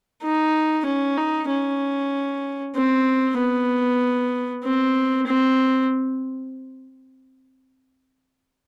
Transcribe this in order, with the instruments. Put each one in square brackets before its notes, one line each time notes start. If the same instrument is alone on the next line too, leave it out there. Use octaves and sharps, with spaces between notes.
[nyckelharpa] D#4
C#4
D#4
C#4
C4
B3
C4
C4